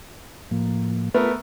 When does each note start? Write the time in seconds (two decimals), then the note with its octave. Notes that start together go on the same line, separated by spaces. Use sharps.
0.51 A2 F3 A#3
1.14 A3 B3 F4 A#4 B5